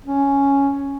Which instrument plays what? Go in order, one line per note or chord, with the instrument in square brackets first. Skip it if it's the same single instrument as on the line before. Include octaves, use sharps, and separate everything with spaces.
[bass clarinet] C#4